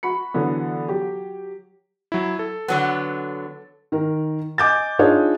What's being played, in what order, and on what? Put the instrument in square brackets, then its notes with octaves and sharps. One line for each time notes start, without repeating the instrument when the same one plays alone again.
[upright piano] F#4 B5 C#7
D3 E3 F#3 B3
F#3 G4
[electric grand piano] F#3 E4
A4
[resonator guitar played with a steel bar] D3 F#3 B3
[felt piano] D#3 A#4
D#5 G#5 D6 G6 A6
D4 D#4 F4 G#4 C#5 D#5